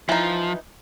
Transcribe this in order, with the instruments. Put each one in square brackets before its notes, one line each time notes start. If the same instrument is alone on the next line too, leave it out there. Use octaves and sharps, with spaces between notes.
[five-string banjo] E3 D#4 [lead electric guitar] F3